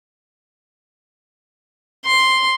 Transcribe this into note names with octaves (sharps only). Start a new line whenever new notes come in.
C6